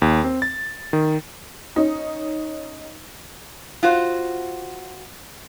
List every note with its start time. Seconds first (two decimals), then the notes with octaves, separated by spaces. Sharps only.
0.02 D#2
0.24 C4
0.42 A6
0.93 D#3
1.76 C#4 D#4
3.83 F4 F#4 C5